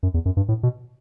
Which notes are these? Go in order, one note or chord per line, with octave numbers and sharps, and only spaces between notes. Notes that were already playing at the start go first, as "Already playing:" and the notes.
F#2
E2
F#2
G2
A2
B2